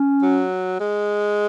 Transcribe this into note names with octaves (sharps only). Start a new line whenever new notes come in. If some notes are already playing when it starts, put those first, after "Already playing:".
Already playing: C#4
F#3
G#3